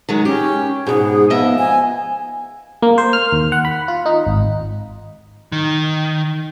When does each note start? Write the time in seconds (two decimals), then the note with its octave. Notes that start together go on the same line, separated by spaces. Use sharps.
0.09 D#3 F#3 G#3
0.25 C#4 G4
0.87 G#2 B2 G#4
1.30 F3 B3 D#5 E5
1.58 G#5
2.82 A#3
2.98 C5
3.13 F6
3.32 D#2
3.52 F#5
3.65 B5
3.88 F4
4.06 D#4
4.27 G#1
5.52 D#3